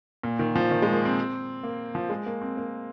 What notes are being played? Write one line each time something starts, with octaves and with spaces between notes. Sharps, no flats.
A#2
D#3
F3
D#3
G#3
A#3
C4
A#3
F3
G#3
A#3
C4
A#3